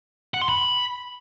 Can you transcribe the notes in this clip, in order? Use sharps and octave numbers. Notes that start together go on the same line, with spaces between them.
F#5
C6
B5